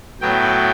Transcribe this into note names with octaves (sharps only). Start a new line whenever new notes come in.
A2 F#3 B3 G5